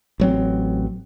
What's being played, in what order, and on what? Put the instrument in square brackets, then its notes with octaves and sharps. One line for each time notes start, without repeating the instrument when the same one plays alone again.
[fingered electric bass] A1 F#3 C4